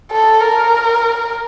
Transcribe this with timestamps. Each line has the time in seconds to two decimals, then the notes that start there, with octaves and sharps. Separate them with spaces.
0.12 A4
0.41 A#4